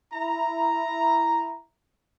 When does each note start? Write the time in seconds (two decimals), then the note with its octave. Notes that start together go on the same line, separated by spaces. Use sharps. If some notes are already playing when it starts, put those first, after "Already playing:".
0.13 E4 A#5